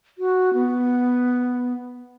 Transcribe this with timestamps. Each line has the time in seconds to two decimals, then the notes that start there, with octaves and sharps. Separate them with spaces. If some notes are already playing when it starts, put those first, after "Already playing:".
0.18 F#4
0.54 B3